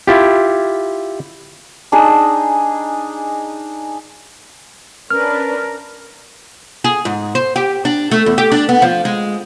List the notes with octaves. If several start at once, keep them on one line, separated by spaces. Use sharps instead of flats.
E4 F4 G4
D4 D#4 G#4
C#4 D4 A#4 B4 F6
G#4
G#2
C5
G4
D4
A3
E2
G4
D4
B3
F3
G#3